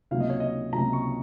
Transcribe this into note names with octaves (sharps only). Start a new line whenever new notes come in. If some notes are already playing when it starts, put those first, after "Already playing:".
C#2 C3 F#3 A#3 F5
D#5
C#5
D#5
C#2 C3 F#3 A#3 A#5
C#6